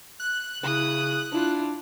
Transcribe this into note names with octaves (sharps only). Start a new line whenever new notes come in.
F#6
C#3 E4 D#6
D4 E4 F4